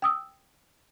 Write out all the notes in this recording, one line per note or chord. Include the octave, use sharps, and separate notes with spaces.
G5 D#6 E6